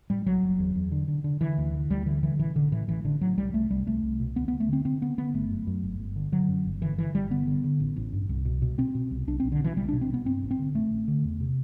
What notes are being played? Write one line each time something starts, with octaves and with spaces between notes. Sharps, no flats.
A2 G3
B1 F#3
F#1
E2
E2
D3
D3
D3
D3 E3
D2
D3
D2 G3
D3 E3
D3 E3
A1 E3
A1 D3
A2 E3
A1 E3
A1 D3
A2 F#3
C2 G3
C2 A3
C2 G3
C2 A3
C2
B2
D2 B3
B3
D2
A3
D3 C4
D3 C4
D3 B3
D3 B3
G1 A3
F#2
F#2
G1
G1
D3
D3 F#3
F#2
G1
D3 E3
D3 E3
G1 G3
D3 B3
D3
D3
A1
A1
G2
C2
B2
B2
B2 C4
B2
C2
B1 D4
C4
B1
D3
B2 E3
B1 G3
D4
B2
C4
B2 B3
G2 C4
A1
C4
D3
A1 A3
A1
D3
E2
C3